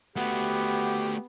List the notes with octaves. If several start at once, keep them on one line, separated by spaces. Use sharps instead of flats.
A3 B3 F#4 G4